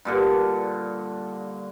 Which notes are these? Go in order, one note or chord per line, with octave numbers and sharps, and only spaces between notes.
G2 A#2 D3